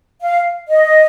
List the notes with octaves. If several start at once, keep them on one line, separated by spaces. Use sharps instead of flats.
F5
D#5